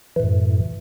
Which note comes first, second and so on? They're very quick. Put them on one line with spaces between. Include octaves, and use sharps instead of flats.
E3 A2 F#2